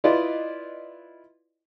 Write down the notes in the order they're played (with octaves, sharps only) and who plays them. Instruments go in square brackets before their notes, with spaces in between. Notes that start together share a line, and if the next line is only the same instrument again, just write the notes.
[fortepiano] E4 F4 B4 D5 D#5